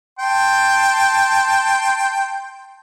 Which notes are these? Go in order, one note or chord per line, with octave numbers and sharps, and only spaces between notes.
G5 A5 C6